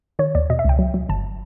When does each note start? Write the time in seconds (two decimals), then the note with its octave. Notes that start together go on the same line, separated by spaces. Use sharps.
0.19 D#3 C#5
0.35 D#2 D5
0.50 B2 D#5
0.59 E5
0.65 C#2 G5
0.79 F#3
0.94 F#3
1.09 G1 A5